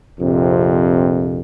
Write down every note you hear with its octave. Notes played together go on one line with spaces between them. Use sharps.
A#1 F2 C3